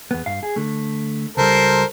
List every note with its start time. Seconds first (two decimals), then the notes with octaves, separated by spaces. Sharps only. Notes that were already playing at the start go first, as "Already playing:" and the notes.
0.11 E2 B3
0.26 G2 F5
0.43 G#4
0.56 D3 A3
1.37 C#2 G3 A4 A#4 C5